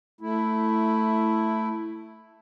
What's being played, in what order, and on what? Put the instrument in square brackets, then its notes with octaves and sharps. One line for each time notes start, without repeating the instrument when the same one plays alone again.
[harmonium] A3 E4